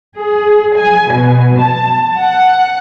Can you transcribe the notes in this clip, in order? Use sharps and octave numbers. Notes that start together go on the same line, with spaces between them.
G#4
G#5
B2
A5
F#5